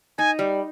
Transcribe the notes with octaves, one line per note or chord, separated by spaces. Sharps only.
D#4 G#5
G3